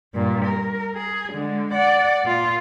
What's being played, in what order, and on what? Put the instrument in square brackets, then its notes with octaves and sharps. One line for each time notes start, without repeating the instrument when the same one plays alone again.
[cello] G2 A#2
A#4
G#4
D3 G#3
D5 F#5
A#2 F4